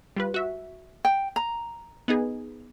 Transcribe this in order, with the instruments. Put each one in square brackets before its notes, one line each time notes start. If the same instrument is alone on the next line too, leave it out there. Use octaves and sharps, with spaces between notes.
[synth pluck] G3 F4 B4
F#4 E5
[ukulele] G5
A#5
[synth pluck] B3 D#4 G#4